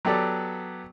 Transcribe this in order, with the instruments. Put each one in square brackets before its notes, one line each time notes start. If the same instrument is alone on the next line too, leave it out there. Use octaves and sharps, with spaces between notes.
[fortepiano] F#3 B3 G4 A4 D5